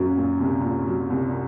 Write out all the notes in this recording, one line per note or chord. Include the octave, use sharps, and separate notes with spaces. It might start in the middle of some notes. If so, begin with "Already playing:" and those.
Already playing: F#2 A#2 F#3
A#2
C2
A#2
F#3
C2